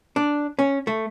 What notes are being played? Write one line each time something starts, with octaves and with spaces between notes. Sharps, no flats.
D4
C#4
A3